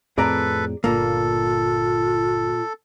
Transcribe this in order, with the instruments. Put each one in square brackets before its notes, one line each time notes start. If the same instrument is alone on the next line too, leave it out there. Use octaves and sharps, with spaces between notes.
[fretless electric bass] F2 A2 C4 [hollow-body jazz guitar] G#4 D5 A#5 [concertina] A4 B4
[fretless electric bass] G1 [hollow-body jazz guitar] A#2 A#3 [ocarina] F4 [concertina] A4